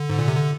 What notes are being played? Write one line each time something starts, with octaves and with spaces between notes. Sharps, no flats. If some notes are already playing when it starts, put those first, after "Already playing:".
Already playing: D3
G#2
A#2
C3
D3